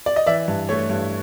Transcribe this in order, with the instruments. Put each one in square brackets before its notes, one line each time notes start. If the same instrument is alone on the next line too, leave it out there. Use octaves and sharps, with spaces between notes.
[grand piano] D5
D#5
E3 D5 E5
G2
A3 C#5
G2